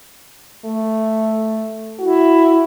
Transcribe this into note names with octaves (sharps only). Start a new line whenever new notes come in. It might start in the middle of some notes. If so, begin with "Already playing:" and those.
A3
E4 F#4